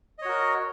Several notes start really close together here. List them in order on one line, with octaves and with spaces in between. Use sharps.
D#5 C#5 F#4 A#4